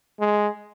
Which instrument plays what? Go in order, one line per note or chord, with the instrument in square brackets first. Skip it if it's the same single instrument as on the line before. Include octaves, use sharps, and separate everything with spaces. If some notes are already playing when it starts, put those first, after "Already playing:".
[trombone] G#3